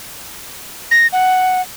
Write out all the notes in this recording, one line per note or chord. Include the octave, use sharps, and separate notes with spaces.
A#6
F#5